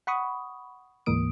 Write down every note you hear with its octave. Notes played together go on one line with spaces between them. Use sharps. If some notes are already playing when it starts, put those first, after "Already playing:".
F#5 B5 C#6 D#6
D2 G#2 E3 A#3 D#6 D7